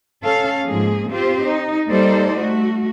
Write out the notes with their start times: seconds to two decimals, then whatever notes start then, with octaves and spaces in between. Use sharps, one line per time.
0.23 C#4 A4 F5
0.67 G#2 F3 A#3 G#4
1.10 C4 F4 G4 C5
1.45 D#4
1.90 G3 A#3 D#4 A4 C5 D5
2.40 A3 F#4